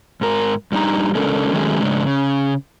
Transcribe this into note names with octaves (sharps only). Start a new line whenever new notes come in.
G#2 A#4
G2 G3 D4 D#4 A#5
C#3 G#3 C#4 D4 A4 A#4
D#3 F#3 G#3 A3 C#4 G#4
G#2 C#3 G#3 D4
C#3